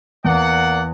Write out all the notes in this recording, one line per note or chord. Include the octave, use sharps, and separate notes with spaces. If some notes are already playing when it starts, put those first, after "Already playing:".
E2 A#3 D5 F#5